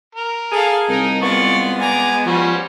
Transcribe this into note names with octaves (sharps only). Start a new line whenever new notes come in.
A#4
G#4 A4 F5
C2 D#4 A#4 D#5
G#3 B3 F4 D5 C#6
G#5 A#5 D6
F3 G3 C#4 F#4 C6